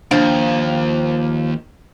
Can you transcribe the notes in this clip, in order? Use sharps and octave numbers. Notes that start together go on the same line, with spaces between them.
D#2 F3 D4